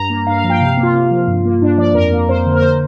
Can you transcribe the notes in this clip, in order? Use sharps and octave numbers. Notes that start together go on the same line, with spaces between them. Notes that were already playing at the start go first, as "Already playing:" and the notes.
Already playing: G2 A#5
A#3
G2 F5
F5
F3
G5
C3 F5
A#3
F4
C3
F3
G2
A#3
G2 D4
F3 D5
F2 A#4
A#3
F2 C5
D3
A#4
C5